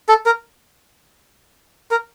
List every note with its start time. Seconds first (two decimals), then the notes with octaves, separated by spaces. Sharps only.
0.09 A4
0.26 A#4
1.91 A#4